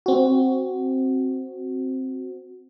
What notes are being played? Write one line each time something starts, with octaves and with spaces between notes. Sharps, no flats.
C4 F#4